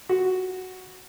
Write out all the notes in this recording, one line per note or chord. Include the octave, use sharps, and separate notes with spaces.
F#4